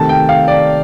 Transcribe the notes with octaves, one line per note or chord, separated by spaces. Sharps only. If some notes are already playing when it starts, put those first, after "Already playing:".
Already playing: C3 D#3 A3 A5
G5
F5
D5